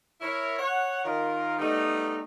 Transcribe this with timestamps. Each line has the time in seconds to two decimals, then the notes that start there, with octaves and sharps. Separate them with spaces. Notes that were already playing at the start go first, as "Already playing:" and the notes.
0.21 E4 A#4 C#5
0.59 C#5 F#5
1.05 D#3 F4 A#4
1.58 G3 A3 B3 D#4